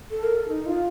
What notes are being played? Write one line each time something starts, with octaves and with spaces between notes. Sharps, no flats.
A4
A#4
A4
D#4
F4